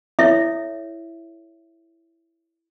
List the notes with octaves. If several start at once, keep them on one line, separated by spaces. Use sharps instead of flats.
E4 A4 C#5 E5